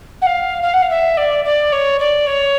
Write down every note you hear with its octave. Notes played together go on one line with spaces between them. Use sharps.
F#5
F5
F5
F#5
F5
E5
D5
D5
C#5
D5
C#5